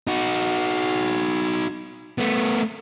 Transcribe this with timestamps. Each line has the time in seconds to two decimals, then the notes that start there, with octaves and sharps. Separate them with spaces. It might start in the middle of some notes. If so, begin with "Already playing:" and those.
0.07 D#4 F#4
2.18 A3 B3